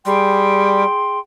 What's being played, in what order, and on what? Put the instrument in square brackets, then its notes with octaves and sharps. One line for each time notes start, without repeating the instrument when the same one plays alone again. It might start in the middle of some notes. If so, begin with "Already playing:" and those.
[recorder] G3 [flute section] G#4 G5 C6